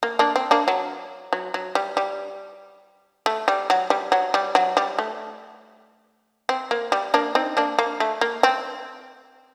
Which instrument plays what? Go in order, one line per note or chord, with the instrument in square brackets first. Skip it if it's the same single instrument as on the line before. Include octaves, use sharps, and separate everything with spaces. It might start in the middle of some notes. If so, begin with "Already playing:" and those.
[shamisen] A#3
A#3 D4
C4
A#3 D4
F#3
F#3
F#3
G3
G3
A3
G3
F#3
G3
F#3
G3
F#3
G3
A3
C4
A#3
G3
A#3 D4
C4 D#4
A#3 D4
A#3
A3
A#3
C4